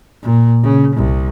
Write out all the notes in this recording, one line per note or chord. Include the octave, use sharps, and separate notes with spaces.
A#2
C#3
C2